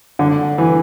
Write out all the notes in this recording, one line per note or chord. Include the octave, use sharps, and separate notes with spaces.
D3
E3